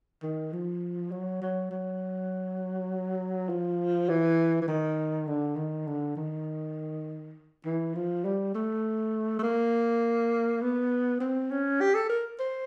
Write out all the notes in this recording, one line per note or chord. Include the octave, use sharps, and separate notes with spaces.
D#3
F3
F#3
F#3
F#3
F3
E3
E3
D#3
D3
D#3
D3
D#3
E3
F3
G3
A3
A3
A#3
B3
C4
C#4
G4
A4
A#4
C5